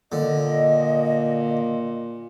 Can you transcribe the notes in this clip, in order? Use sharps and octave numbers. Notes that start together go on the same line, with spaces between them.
A#2 D3 D#5